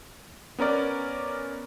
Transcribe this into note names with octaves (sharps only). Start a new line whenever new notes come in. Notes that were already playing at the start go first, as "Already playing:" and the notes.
B3 C#4 A#4 D5